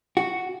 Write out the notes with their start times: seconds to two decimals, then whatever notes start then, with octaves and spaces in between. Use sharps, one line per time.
0.17 F#4